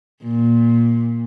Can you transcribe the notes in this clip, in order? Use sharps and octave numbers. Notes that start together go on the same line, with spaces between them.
A#2